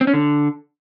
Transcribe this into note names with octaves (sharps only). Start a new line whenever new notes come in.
C4
C#4
D3